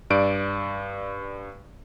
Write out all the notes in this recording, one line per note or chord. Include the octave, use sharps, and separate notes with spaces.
G2 D5 D7